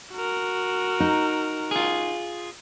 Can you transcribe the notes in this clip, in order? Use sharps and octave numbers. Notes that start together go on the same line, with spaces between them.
F#4 A#4
D#4
F4 G#4